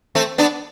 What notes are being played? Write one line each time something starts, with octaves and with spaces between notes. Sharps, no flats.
A3 C4
B3 D4